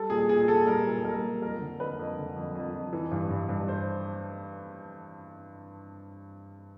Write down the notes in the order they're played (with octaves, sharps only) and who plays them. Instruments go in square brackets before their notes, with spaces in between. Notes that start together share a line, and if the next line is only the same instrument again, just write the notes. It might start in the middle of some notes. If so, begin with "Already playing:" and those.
Already playing: [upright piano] G3 A4
A#2 G#4
A#2 G#4
A#2 A4
G3 A#4
A#2
A4
G3 A#4
G3
F2 A#4
D3
F2 B4
F2
D3
F2
F2
F2
E3
G2
G2
G2
C5